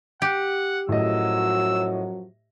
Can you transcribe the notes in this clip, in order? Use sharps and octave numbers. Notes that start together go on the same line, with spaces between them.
G4 F#5
F#2 A2 F3 F#3 D#5 E6